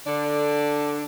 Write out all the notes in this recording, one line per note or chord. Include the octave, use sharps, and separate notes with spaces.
D3 D4